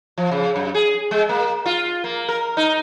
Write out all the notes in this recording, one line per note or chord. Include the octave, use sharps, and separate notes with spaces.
F3
C#3
F#2
G#4
G#3
A#3
F4
A#3
A#4
D#4